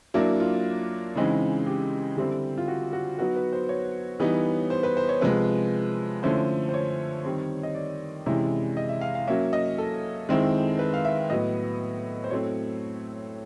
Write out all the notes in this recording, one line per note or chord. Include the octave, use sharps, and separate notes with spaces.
F#3 A#3 D4 E4
F4
C#3 E3 G#3 C4 D#4
G4
D3 G3 C4 E4
F4
F#4
F#4
F#3 B3 D#4 F#4
B4
C5
C#5
E3 G3 B3 D#4
C5
B4
C5
C#5
C3 F3 G#3 B4
D3 F3 A3 C#4 E4 C5
C5
C#5
D#3 G3 C4
D#5
D5
C3 E3 G#3 C#4 E4
D#5
E5
F5
F5
F#3 A#3 C#4 E5
D#5
A4
D#3 G#3 C4 E4
B4
F5
E5
A2 F#3 B3 D#5
C5
A2 F#3 A3 C4 C#5